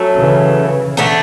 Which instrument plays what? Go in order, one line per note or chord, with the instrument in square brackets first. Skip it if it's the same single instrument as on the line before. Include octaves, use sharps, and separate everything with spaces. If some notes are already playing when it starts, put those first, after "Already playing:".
Already playing: [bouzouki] F#3 A3 C#4
[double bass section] C#3 E3
[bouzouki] D3 A3 D4